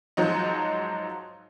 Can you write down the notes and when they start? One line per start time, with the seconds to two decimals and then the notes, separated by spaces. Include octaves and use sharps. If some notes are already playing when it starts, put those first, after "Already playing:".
0.17 G#2 F3 F#3 D#4